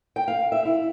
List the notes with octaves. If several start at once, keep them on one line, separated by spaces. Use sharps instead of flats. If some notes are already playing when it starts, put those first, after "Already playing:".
G5
F5
E5
E4